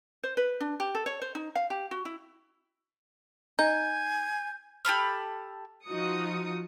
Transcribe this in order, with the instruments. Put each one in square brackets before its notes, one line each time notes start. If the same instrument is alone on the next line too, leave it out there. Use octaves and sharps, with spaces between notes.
[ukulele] C5
B4
D4
G4
A4
C#5
C5
D#4
F5
G4
F#4
E4
[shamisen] D#4 [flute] G#5 [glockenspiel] G6
[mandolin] G4 A4 B5 F6
[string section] F3 D#4 F4 F#4 D#6 C#7